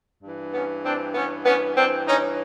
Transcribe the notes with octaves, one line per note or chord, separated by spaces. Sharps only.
G2 E3
B3 C#4
C4 D4
B3 C#4
B3 C#4
C4 D4
C#4 D#4